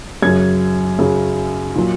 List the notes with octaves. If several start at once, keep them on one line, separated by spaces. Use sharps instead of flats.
F#2 C#3 F#3 G#6
F#2 C#3 F#3
A#2 F#3